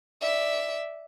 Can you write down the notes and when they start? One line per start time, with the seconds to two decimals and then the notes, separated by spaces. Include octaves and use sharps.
0.22 D5 E5